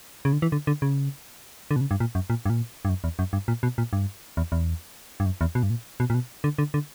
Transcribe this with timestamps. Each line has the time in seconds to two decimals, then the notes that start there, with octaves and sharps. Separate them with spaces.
0.25 C#3
0.33 D3
0.42 E3
0.52 D3
0.67 D3
0.82 C#3
1.71 D3
1.76 B2
1.81 C#3
1.91 G2
2.00 A#2
2.15 F#2
2.30 A#2
2.46 G2
2.50 A#2
2.85 G2
2.89 F#2
3.04 E2
3.19 F#2
3.33 G2
3.48 A#2
3.63 B2
3.78 A#2
3.93 G2
4.37 E2
4.52 E2
5.20 G2
5.26 F#2
5.41 E2
5.55 B2
5.63 G2
5.70 A#2
6.00 B2
6.10 A#2
6.14 B2
6.44 D3
6.59 D3
6.74 D3